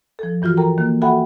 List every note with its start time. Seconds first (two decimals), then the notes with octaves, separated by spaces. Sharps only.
0.19 F3 A4
0.42 G2 E3 F4 F#4 F6
0.57 A4 A#4 G5 A#5
0.78 D#3 A#3
1.02 F#4 A4 E5 F#5 G5 B5